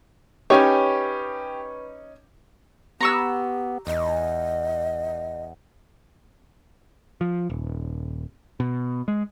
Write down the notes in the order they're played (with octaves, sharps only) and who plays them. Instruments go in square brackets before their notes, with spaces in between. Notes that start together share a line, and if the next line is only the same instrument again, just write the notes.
[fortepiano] C#4 D#4 [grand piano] G4 [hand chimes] B4 B5 C#6 [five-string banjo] C#5 G#5
[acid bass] B3 [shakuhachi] G4 [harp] A#5 C#6 E6
[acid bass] E2 [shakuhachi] D#5
[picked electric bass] F3
D#1
B2
G#3